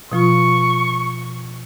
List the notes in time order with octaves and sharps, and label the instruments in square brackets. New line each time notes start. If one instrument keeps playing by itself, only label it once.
[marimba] B2 F3 F4 [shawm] C#6